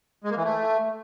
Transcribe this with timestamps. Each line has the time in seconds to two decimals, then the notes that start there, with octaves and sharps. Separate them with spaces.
0.24 G#3
0.31 A#3
0.37 E3
0.43 A3